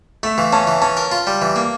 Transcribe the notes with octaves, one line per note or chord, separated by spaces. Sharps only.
A3 E5
E3 F5
C#4 A5
E3
C#4 A5
A#4
F4
G3
E3
A#3